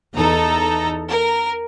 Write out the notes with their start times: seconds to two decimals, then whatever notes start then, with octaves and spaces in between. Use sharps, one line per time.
0.15 E2 D#4 A4 A#5
1.08 A#4